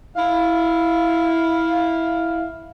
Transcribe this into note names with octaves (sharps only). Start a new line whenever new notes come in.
E4 F5